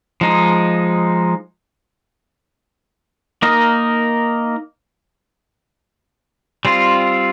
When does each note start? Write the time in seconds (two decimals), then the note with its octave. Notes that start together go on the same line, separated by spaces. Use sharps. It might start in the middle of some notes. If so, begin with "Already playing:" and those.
0.21 F3 G#3 D#4
3.42 A#3 D#4 A#4 D#5
6.65 G3 C4 F4